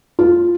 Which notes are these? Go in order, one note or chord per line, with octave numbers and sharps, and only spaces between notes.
F4